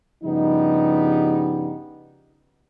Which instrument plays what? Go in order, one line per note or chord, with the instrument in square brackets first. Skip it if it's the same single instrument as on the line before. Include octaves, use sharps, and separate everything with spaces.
[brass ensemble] G2 C#3 F3 G3 B3 D#4